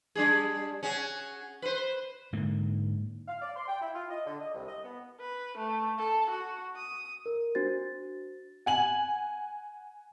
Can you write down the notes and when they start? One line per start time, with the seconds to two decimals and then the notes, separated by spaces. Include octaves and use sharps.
0.15 G3 D4 G#4
0.83 C#4 F#4 G#4
1.62 B4 C5
2.33 G#2 D3 A#3
3.28 F5
3.42 D5
3.56 C6
3.68 G5
3.81 E4
3.94 F4
4.10 D#5
4.26 D3
4.40 D#5
4.54 C2
4.68 D#5
4.84 B3
5.20 B4
5.57 A3
5.98 A4
6.30 F#4
6.77 D#6
7.26 A#4
7.55 D4 F#4 C5 A6
8.66 F#5 G#5 F#7